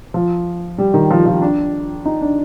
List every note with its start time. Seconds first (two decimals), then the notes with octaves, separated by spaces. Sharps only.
0.14 F3
0.78 G3
0.94 D#3
1.10 F3
1.26 F3
1.42 D4
2.05 D#4
2.22 D4